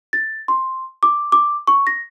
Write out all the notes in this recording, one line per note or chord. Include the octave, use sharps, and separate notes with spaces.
A6
C6
D6
D6
C#6
A#6